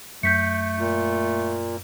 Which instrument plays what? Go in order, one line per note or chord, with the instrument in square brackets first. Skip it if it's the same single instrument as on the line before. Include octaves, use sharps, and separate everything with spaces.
[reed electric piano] F#2 [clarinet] A3 [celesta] G6 B6 C#7
[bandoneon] A#2